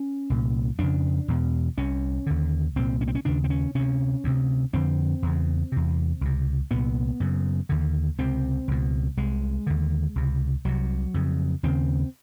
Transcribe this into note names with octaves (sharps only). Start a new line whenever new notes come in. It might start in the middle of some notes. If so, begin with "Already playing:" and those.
Already playing: C#4
C2 A#2
F2 C#3 D4
E2 B2
C2 C3 C#4
D#2 D3
C2 A#2 C4
C#4
C4
C#4
D#2 C#3 D4
C4
C#4
D2 C3 C#4
D2 C3
F2 D3 C4
E2 C#3
E2 C3
C#2 C3
C2 A#2 B3
F#2 C#3
D#2 D3
C#2 C3 C4
C#2 B2
C2 C3 G#3
D#2 D3
C#2 C3
C2 C3 F#3
F2 C#3
D#2 C#3 C4